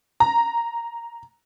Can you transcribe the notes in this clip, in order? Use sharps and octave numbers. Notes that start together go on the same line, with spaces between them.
A#5